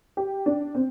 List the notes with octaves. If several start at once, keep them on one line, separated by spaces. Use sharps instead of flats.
G4
D4
C4